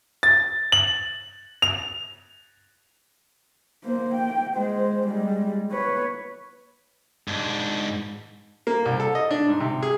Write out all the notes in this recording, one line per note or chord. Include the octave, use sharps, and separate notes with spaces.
A6
F#7
F7
A#3 C5
G5
G#3 C5
G3 G#3
B4 C#5
G#2 D4
A#3
C2
A4
D#5
D4
G#2
C3
G#4